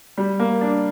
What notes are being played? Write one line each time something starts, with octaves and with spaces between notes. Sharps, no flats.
G3
A#3
D4